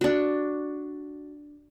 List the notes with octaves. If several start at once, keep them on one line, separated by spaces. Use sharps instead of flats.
D4 F#4